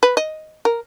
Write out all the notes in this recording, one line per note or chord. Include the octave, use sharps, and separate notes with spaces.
B4
D#5
A#4